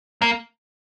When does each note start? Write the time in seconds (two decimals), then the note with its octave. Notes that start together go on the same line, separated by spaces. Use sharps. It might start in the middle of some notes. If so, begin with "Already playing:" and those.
0.22 A#3